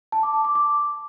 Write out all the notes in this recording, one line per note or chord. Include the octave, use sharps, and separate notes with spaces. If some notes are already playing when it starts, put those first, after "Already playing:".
A5
D6
D6
D6
D6